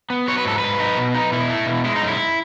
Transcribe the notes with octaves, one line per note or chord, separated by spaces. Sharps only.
B3
F#3 C#5
B4
G#2 A4
G#2 B4
D#4
B2
D#4
B2 E4
A3
B2
G#3 E4
D#4
F#2
E4